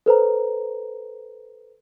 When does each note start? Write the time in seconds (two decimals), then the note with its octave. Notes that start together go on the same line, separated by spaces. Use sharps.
0.06 A4 B4 C5 A#5